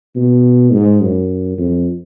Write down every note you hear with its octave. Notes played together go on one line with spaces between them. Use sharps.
B2
G#2
F#2
F2